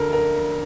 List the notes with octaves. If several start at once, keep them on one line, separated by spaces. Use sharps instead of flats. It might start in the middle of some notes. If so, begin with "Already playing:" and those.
Already playing: D2 D3 A4 A#4
A#4